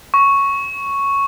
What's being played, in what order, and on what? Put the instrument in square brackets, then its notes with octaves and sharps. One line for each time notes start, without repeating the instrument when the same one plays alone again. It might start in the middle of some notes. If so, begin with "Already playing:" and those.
[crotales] C#6